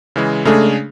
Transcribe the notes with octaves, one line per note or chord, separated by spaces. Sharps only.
C#3 E3 G#3
C#3 G#3 A3 D4 G#4